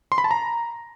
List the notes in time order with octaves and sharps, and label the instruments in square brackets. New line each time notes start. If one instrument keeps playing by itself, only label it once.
[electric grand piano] C6
B5
A5
A#5